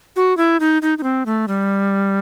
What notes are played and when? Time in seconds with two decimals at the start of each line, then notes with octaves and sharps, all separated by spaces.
0.16 F#4
0.37 E4
0.60 D#4
0.82 D#4
0.98 D#4
1.03 C4
1.26 A3
1.48 G3